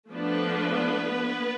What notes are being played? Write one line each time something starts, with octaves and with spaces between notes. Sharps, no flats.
F3 A3 B3 D4 B4